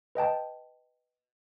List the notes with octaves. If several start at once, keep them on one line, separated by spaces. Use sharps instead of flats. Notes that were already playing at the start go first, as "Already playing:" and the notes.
B4 D#5 G5 A5